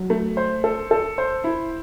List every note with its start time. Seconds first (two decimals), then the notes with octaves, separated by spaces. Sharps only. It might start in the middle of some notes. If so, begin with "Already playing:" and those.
Already playing: F#3
0.10 A3
0.37 C5
0.64 A4
0.91 A4
1.18 C5
1.44 E4